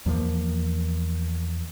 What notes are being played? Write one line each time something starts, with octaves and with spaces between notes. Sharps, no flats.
E2 F3 A#3